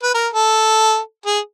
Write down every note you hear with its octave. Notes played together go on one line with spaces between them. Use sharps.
B4
A#4
A4
G#4